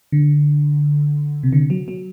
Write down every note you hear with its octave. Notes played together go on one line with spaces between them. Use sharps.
D3
C3
D3
F#3
F#3